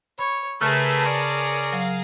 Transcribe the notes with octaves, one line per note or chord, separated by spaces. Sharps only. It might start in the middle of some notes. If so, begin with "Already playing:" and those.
C#5 B5
C#3 A3 G#4 A#4 B4 A5
C#4 C#5 D5
F#3 F5